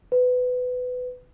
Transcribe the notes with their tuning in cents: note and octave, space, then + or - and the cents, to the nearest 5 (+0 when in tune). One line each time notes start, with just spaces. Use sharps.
B4 +20